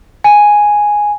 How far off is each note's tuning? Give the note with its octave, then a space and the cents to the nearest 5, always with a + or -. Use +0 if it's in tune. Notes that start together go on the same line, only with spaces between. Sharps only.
G#5 +0